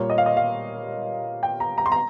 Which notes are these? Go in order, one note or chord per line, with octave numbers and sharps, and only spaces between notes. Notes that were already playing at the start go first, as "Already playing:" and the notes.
Already playing: A#2 G3 A#3 C#5
D#5
F5
D#5
F5
G5
A#5
A#5
C6
A#5